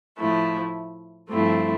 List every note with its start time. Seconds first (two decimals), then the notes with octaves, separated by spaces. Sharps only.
0.17 A2 F3 A3 E4
1.29 G2 F3 A3 C4 E4